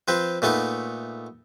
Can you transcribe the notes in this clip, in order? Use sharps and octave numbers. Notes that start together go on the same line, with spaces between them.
F3 C4 B4 C5
A#2 A3 B3 D#4